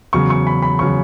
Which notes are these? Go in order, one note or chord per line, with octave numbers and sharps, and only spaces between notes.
E2 C#3 F#3 C#6
C#6
B5
B5
C#3 F#3 C#6